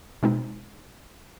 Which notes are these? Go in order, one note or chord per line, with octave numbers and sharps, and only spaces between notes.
B2 G#3 C4 D#4